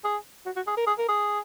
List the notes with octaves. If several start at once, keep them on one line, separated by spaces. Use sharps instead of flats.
G#4
F#4
F#4
G#4
A#4
G#4
A#4
G#4